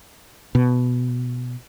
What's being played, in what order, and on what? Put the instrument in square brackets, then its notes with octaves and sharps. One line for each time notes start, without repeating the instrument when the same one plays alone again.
[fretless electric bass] B2